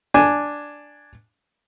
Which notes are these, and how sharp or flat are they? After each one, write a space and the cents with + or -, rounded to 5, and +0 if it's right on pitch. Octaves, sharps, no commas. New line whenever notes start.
D4 +0 G#5 +0